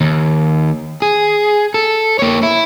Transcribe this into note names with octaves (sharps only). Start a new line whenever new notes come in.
D#2
G#4
A4
A#3 C#5
E4